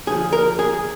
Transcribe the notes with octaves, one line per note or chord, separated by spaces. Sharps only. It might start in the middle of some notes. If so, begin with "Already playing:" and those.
D2 D3 F3 G#4
A#4
G#4